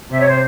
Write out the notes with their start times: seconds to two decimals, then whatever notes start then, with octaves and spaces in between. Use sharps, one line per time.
0.11 C3 E5
0.19 C#5
0.28 C5